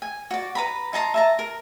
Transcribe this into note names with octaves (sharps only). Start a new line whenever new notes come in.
G#5
F#4 D5
B4 A#5 B5
D#4 A5 A#5 C6
E5 A5 A#5
A#4